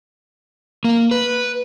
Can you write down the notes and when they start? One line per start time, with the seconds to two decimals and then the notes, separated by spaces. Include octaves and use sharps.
0.84 A#3
1.11 B4